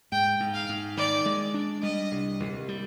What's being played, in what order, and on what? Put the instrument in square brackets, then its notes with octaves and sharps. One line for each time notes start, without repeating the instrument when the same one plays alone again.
[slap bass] G#2 [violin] G5
[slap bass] G#2
[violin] F5
[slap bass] G#2
[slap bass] D#3 [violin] D5
[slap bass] G#3
D4
[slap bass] G3 [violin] D#5
[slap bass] C2
C2
G3